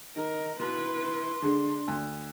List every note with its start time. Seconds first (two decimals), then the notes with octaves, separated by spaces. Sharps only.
0.16 D#3 A#4 D#5
0.59 B2 E4 B4 C6
1.42 D3 G#3 D4
1.88 D2